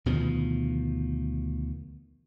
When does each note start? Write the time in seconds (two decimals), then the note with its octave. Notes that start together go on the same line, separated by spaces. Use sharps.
0.06 D2 B2 D#3 F3